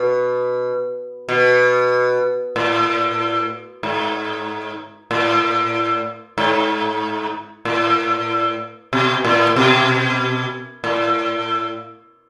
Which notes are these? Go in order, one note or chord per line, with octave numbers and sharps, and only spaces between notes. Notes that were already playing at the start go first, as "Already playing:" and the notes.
Already playing: B2
B2
A2
G#2
A2
G#2
A2
B2
A2
B2
A2